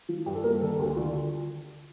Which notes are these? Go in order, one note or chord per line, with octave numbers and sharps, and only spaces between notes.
F3
G2 G4
A4
A#3 A#4
D3 A4
D2 G4
D3 F4